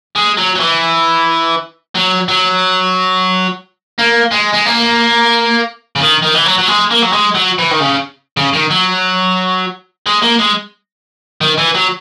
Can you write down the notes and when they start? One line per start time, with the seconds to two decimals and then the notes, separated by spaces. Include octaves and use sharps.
0.16 G#3
0.38 F#3
0.56 F#3
0.60 E3
1.95 F#3
2.28 F#3
3.98 A#3
4.31 G#3
4.53 G#3
4.66 A#3
5.96 C#3
6.01 D#3
6.22 D#3
6.34 E3
6.45 F#3
6.58 F#3
6.68 G#3
6.91 A#3
7.03 F#3
7.13 G#3
7.35 F#3
7.58 E3
7.71 D#3
7.80 C#3
8.37 C#3
8.54 D#3
8.70 F#3
10.06 G#3
10.23 A#3
10.40 G#3
11.41 D#3
11.58 E3
11.75 F#3